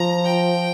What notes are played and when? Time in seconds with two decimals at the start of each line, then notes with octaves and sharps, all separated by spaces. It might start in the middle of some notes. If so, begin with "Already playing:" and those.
Already playing: F3 A#5
0.26 G5